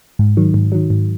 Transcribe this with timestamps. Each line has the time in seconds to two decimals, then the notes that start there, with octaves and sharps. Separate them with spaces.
0.19 G#2
0.37 D#3 F#3
0.54 G#2
0.72 D#3 F#3
0.90 G#2